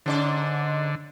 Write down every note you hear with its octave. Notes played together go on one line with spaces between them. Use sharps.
G#2 D3 C#4 D5